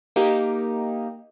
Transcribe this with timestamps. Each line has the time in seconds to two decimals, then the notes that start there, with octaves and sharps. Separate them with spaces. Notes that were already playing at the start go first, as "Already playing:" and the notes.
0.16 A#3 D#4 G4